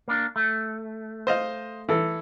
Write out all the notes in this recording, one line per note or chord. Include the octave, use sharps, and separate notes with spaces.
A#3 D4
A3
C5 D#5 F5
E3 A4